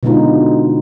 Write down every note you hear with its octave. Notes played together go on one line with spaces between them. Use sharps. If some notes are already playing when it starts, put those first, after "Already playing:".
B2 D3 G#3 B3 D#4 F4